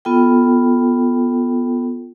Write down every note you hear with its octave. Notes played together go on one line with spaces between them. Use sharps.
B3 F4 A4 G5